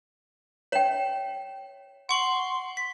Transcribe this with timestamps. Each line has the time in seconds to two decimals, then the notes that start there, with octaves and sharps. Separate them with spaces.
0.72 C#5 E5 G5 E7
2.09 F#5 C6 C#6 F#7
2.77 B6